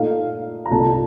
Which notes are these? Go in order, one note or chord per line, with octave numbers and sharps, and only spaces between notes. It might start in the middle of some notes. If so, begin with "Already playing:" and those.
Already playing: A#2 A3 D#4 F5
A#5
C2 A#2 A3 A5